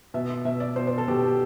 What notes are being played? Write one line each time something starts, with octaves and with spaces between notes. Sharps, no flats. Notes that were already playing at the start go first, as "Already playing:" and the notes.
B2 E5
B2 E5
D5
B2 C5
C5
A4
B2 G4
G4